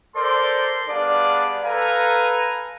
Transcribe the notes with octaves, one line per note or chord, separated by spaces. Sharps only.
A4 A#4 C5 D5 C6
G3 B3 D4 G#4 D5 F5
A4 B4 F5 G#5 A#5